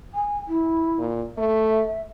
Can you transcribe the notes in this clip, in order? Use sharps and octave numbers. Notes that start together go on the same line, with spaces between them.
G#5
E4
A#2
A3 E5